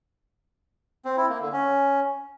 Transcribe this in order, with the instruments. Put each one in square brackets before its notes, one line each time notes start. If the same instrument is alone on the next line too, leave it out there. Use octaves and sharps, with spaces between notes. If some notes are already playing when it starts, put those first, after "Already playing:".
[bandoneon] C4
E4
A#3
D3
C#4